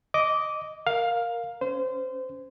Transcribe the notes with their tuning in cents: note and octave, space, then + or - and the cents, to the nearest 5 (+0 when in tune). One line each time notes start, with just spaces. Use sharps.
D#5 +0 D6 -15
A#4 +0 F5 +10
C#4 +0 C5 -25